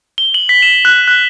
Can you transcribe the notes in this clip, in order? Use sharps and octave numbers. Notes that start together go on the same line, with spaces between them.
G7
F#7
B6
E7
F#6
F#6